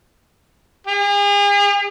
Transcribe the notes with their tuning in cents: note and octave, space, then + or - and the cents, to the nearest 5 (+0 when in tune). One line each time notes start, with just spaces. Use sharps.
G#4 -40